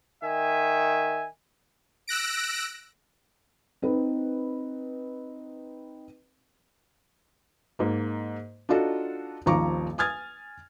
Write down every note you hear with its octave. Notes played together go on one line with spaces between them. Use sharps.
D#3 E5 G#5
E6 F#6 A#6 D7
C4 D#4 B4
G#2 A#3
D4 D#4 F4 F#4 A4
D#1 G#1 F3 A#5 C#6 D6
G#5 D#6 F6 G#6 A6